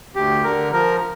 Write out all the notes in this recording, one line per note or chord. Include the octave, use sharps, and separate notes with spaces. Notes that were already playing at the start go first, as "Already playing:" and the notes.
D2 G4
D3 A#4
F3 A#4